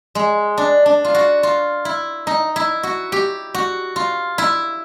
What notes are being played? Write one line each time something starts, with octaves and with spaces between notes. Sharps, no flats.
G#3
D4
D4
F4
F#4
F4
E4
D#4
E4
F#4
G4
F#4
F4
E4